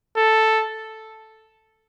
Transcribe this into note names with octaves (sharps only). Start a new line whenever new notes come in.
A4